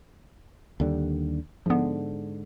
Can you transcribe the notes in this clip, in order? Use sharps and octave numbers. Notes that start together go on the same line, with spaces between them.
D#2 D3 G3
G#2 D3 F3 B3